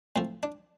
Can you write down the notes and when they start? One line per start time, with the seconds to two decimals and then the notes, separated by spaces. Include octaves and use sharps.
0.16 A2 F3 C4
0.43 D4